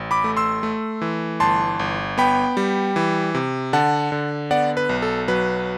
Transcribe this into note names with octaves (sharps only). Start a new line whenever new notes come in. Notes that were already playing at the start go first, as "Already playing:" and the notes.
Already playing: A1
B5 D6
A3
C6 E6
A3
E3
G1 A5 C6
G1
B3 G5 B5
G3
E3
C3
D3 F#5 A5
D3
B3 D5 F#5
B4
B1
A4
F#3 B4